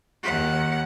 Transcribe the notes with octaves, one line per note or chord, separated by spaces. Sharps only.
D#2 F#5